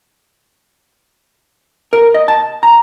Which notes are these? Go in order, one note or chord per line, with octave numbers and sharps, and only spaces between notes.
A#4
D#5
A5
A#5